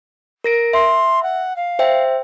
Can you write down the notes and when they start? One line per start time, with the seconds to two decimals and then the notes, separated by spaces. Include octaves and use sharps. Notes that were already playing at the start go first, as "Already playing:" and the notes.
0.44 A#4 A#6 D7
0.73 E5 C6
1.22 F#5
1.56 F5
1.79 C5 E5 G5